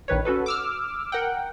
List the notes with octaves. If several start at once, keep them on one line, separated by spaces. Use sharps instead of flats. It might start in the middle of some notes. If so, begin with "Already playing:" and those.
A#1 D#3 B4 C#5
C#4 F#4 A4 B4
D6 E6 F6
A#4 F#5 G5